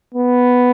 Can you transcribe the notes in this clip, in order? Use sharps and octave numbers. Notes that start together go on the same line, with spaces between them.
B3